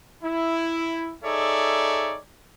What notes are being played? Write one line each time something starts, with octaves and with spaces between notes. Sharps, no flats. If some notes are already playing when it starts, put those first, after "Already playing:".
E4
D#4 G#4 A4 C#5 D5 E5